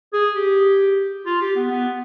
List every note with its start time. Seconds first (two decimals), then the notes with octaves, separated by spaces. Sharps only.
0.13 G#4
0.36 G4
1.26 F4
1.41 G4
1.56 B3
1.71 B3